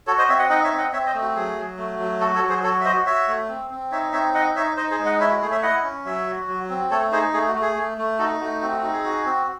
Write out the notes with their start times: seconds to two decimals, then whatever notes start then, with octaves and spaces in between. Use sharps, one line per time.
0.07 F#4 A4 C#5
0.18 C5 D#5
0.29 C4 C#5 E5
0.39 D#5 F#5
0.50 D#4 D#5 F#5
0.64 C#5 E5
0.71 C4
0.78 D#5 F#5
0.92 C4 C#5 E5
1.06 C5 D#5
1.14 A3
1.22 F#4
1.35 F#3 G#4
1.56 F#3
1.77 A3
1.99 F#3
2.20 F#4 A4
2.35 A4 C#5
2.42 F#3
2.49 G#4 C5
2.63 F#4 A4 C#5
2.81 E5
2.85 F#4 C5 D#5
3.06 F#4 C#5 E5
3.28 A3
3.49 C4
3.70 C4
3.92 D#4 C#5 E5
4.12 C4 C#5 E5
4.34 D#4 D#5 F#5
4.55 D#4 C#5 E5
4.77 D#4 C5 D#5
4.91 G#4 C5
4.99 G#3
5.05 D#5 F#5
5.20 E4 C#5 E5
5.30 F#4
5.42 A3 G#4
5.52 C#5 E5
5.63 E4 D#5 F#5
5.83 C#4
6.05 F#3 C#5 E5
6.27 F#4
6.48 F#3
6.69 C4
6.91 A3 A4 C#5
7.12 D#4 G#4 C5
7.34 A3 G#4
7.48 F#4
7.55 A3
7.62 G#4
7.76 A3
7.98 A3
8.19 D#4 F#4 A4
8.40 A3 F#4
8.61 C4 F#4
8.72 F#4
8.82 D#4 F#4
8.93 G#4
9.05 F#4
9.25 C4